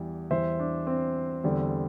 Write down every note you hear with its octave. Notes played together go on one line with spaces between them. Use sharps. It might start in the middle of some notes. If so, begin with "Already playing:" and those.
Already playing: E2 E3 G3
E2 E3 G3 C5 E5
D4
C4
E2 D3 G3